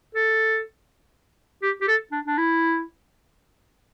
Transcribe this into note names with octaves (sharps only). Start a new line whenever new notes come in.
A4
G4
G4
A4
D4
D4
E4